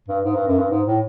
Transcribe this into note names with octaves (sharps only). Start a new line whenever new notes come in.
G2
G#2
G2
F#2
G2
G#2
A2